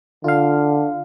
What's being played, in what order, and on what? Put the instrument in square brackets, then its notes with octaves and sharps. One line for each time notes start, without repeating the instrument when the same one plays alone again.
[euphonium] D3 [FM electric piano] F4 F5